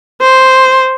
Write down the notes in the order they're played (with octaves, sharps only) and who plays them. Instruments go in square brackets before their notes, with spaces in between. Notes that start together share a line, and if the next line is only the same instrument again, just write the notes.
[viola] C5